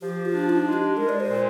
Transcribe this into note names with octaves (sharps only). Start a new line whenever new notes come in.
F3 G4
F4
D4
D#4
G#3
G4
G#3 A#4
D5
C5
A#2